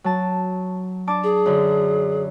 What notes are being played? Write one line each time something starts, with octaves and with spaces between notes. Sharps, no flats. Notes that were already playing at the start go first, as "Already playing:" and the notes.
F#3 A5
D4 A5 D6
G#4
F#2 D3